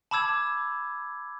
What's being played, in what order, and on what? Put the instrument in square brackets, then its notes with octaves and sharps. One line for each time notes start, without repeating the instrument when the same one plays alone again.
[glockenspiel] A5 B5 D6 E6 G#6